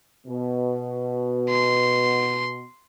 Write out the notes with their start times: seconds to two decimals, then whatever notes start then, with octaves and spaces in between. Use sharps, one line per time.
0.27 B2
1.50 C6